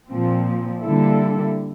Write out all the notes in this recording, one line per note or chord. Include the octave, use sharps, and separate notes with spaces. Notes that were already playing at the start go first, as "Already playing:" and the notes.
A#2 F3 C4
D3 G3 A#3 E4 A4